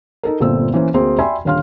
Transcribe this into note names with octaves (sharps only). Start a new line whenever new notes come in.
D#4 A4 A#4
G1 A#2 C4 A4 E6
E3 A#3 C#4 C5
D2 A#3 C4 G#4 C6
D5 E5 G5 G#5 B5 C6
D#1 D3 C#5 F5 C6 F6